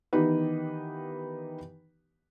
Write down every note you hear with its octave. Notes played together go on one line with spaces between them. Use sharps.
D#3 E3 B3 D#4 G4 B4